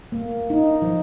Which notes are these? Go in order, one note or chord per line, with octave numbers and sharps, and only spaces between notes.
A#3
D#4
F3